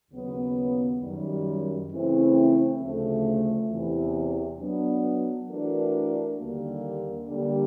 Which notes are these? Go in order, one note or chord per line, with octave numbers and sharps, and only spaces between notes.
D#2 C#3 F#3 B3
F#2 D#3 G3
C#3 E3 A3 C4 E4
D2 C#3 F3 A3
E2 C3 E3
F#3 B3 D4
E3 A3 D4 F#4 A#4
D#2 D3 G3 A#3
D3 G3 A#3